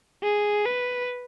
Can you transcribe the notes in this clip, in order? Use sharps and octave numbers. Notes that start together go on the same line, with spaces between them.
G#4
B4